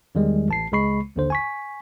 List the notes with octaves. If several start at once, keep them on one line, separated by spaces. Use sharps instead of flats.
E2 D#3 G3 G#3
A1 A5 C7
C#2 C#3 G#3 B5 C#6 C7
A1 D#2 D3 C5
G#5 C#6 B6